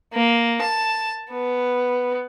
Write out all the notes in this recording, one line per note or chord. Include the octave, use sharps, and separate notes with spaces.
A#3
A5
B3